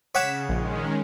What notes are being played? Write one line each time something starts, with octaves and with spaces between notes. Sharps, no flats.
C#3 C#5 F#5 D6 B6 E7
A#1 D#3 G#3 C#4